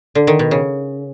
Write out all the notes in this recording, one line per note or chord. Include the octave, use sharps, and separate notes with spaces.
D3
D#3
B2
C#3